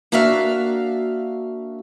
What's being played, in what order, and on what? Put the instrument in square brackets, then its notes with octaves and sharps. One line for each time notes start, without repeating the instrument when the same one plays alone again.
[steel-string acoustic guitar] A#3 D4 F#4 E5 F5